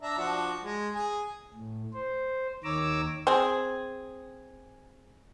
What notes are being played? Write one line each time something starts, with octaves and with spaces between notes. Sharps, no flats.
D4 E5 A#5
F3 D4 F#4
G#3
G#4 G#5
A2
C5
D#2 D#3 C#5 A#5 D6 E6
C4 G#4